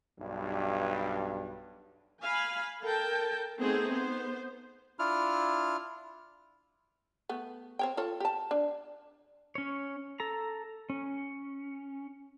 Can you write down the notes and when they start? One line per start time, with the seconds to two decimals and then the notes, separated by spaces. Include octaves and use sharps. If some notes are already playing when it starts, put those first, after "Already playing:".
0.20 B1 G2
2.23 F5 G#5 B5
2.82 A4 A#4 G5 A5
3.61 A3 B3 C4 D#4 G#4 C5
3.92 B3 C5
4.99 D4 E4 F4 F6
7.29 A3 B3
7.79 C4 C#5 G5
7.97 F4 A4 C#5
8.20 G4 A5
8.51 D4
9.55 C#4 C#5
10.20 A4 A#5
10.90 C#4